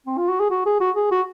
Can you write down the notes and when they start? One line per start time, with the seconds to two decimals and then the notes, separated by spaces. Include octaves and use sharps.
0.07 C4
0.17 F4
0.29 F#4
0.40 G#4
0.51 F#4
0.66 G#4
0.80 F#4
0.96 G#4
1.11 F#4